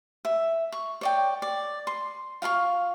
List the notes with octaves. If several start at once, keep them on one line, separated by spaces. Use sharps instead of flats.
E5
C#6
C#5 D5 G5
D5
C6
F4 F5 A#5 C#6